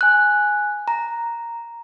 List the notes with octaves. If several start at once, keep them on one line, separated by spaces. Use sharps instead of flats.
G#5 F#6
A#5